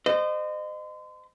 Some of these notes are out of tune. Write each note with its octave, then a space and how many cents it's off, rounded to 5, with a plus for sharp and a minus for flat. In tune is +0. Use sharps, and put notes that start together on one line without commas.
C5 -35 D#5 -30